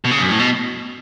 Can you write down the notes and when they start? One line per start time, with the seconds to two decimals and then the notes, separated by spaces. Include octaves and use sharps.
0.04 B2
0.11 C#3
0.20 F#2
0.29 A2
0.39 B2